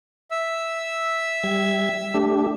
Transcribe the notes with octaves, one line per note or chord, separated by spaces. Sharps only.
E5 E6
G3 G#6
A3 D4 G4